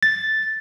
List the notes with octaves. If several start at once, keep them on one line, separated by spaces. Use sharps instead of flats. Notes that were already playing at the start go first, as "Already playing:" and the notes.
A6